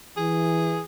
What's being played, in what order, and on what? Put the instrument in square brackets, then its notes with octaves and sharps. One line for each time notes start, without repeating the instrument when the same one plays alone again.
[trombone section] E3 [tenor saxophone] G#4